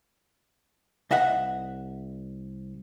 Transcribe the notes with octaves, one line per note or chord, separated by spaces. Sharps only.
C2 D#5 E5 F#5